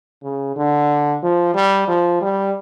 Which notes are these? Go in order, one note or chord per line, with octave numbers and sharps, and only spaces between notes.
C#3
D3
F3
G3
F3
G3